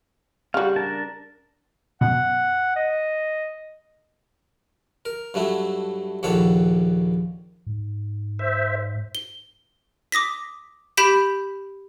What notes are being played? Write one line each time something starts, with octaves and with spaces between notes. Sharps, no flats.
C#3 G3 F#4 F5
D4 A#4 A5
F#2 B2 F#5
D#5
A#4
G2 F#3 A3 E4
A#1 D#2 D#3 A4 C#5 F#5
G#2
C5 E5
G7
D6 D#6 A#6 B6
G4 B5 G6 B6 D7 E7